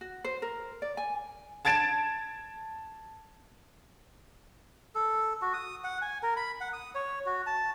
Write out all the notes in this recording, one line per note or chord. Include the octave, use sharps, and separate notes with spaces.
F#4
C5
A#4
D5
G#5
A5 G#6 A6 D7 E7
A4
F#4
D#6
F#5
G#5
A#4
B5
F#5
D#6
C#5
F#4
A5